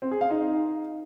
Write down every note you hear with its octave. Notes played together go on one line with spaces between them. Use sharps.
C4
G#4
F5
D#4